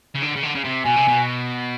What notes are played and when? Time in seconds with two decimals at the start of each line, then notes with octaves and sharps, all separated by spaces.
0.15 C#3
0.22 D3
0.36 C#3
0.43 D3
0.55 C#3
0.65 C3
0.85 B2 G#5
0.96 C3
1.08 B2